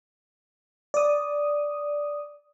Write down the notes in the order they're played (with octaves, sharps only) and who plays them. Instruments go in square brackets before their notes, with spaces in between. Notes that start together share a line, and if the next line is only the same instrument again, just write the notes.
[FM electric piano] D5 D#6